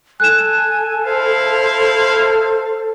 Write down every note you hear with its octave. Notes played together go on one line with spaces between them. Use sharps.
A4 G#5 F#6 E7
E4 C5 F5